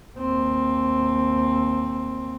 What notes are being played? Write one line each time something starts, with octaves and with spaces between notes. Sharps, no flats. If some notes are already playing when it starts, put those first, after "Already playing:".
D#2 C4